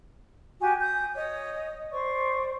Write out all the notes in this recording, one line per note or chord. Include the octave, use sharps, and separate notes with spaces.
F#4 G4 G#5
D#6 G6
C#5 D#5 D#6
C5 D5 C#6